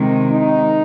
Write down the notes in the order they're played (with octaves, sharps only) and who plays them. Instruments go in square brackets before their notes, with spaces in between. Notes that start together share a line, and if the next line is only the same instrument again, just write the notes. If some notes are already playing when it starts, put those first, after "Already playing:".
Already playing: [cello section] C3 D#3 G#3
[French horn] D#4